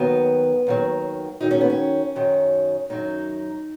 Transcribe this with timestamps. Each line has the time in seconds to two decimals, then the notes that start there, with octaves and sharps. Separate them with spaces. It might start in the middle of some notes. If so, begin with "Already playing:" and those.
Already playing: D#2 D#3 F#3 B3
0.67 D#2 D#3 F#3
1.41 D#2 D#3 F#3 D#4
1.51 C#4
1.61 B3
1.70 C#4
2.16 F#2 D#3 F#3
2.90 F#2 D#3 F#3 D#4